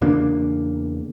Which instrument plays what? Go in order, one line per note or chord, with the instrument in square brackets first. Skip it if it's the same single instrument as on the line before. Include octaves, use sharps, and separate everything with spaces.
[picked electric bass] E2 C#3 A#3 D4